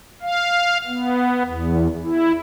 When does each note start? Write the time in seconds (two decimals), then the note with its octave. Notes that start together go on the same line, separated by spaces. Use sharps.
0.22 F5
0.87 B3
1.43 E2
2.02 E4